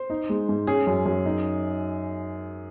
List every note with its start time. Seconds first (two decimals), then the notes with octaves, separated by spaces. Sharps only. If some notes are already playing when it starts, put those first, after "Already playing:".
Already playing: C5
0.10 D#4
0.29 G#3
0.49 G#2
0.67 C#4 G#4
0.87 F#2
1.06 F#2
1.26 D#4